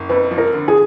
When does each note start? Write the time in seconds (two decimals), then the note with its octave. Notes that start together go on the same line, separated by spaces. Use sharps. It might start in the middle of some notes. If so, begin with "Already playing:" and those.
Already playing: F#1
0.09 F2 B4
0.31 F3
0.38 A#4
0.53 D3
0.68 G#4